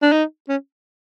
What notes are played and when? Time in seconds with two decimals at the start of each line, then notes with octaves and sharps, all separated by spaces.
0.02 D4
0.12 D#4
0.48 C#4